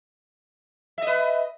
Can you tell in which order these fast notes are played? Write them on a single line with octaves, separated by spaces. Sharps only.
E5 D#5 B4